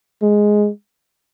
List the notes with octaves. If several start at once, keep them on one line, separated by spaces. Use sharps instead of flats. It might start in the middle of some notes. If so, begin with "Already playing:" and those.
G#3